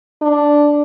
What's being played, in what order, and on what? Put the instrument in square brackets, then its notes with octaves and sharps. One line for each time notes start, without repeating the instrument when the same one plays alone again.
[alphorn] D4